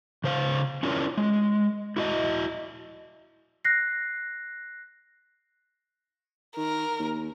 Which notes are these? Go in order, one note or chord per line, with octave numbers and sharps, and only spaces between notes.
C#3 C5 F5
C#4 D4 E4 F4 A#4 C#5
G#3
E4 F#4 D#5
F#6 A#6 C7
D#3 A#4
D#2